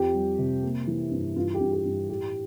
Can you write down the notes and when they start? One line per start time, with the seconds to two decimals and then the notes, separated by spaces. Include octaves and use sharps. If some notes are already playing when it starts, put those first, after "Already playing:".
Already playing: F2 G4
0.14 G3
0.39 C3
0.63 A#3
0.87 E3
1.11 G2
1.36 G2 F4
1.54 G4
1.60 G2
1.72 G4
1.85 G2
2.09 A2 G4